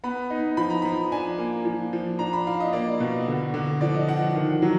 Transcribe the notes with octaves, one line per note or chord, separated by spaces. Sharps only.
B3 B5
D#4
F3 B5
A#5
F3 B5
D4 G#5
A#3
F3
F3
D4 A#5
B5
D4 F5
D#5
A#3 D5
B2
D3
D3
F3 D5
D#5
F3 F#5
F#5
D#3
F#3